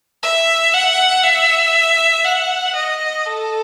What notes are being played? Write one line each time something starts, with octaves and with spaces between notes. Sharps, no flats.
E5
F#5
E5
F#5
D#5
A4